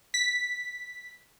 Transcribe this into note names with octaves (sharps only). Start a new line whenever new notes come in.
B6